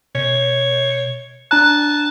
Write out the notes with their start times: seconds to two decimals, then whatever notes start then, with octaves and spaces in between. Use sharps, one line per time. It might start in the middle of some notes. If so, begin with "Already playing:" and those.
0.15 B2 C#5
1.51 D4 A5 A#5 F#6